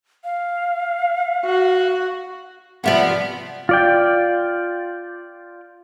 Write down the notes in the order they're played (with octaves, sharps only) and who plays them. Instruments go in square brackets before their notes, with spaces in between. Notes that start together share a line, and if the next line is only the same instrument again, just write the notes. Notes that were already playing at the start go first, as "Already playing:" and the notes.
[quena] F5
[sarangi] F#4
[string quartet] C3 F3 B3 [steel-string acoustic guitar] D5 E5 F#5
[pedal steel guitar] F4 D5 G5